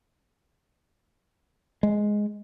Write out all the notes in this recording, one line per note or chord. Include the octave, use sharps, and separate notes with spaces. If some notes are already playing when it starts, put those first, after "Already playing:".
G#3